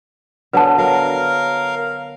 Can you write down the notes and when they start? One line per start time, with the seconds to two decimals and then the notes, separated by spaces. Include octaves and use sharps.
0.53 D3 F#3 B3 B4 A5
0.78 F#3 A#4 F5